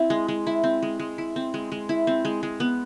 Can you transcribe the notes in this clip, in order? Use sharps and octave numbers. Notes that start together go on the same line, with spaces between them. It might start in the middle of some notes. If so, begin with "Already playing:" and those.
Already playing: C4 E4
G#3
G#3
E4
C4
G#3
G#3
E4
C4
G#3
G#3
E4
C4
G#3
G#3
B3